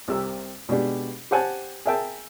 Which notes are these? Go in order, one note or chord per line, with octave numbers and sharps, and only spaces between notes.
C2 C3 G4 E6
B2 G#3 D4 G4
G4 C5 F#5 G#5 A5
G#4 A#4 E5 G5 A5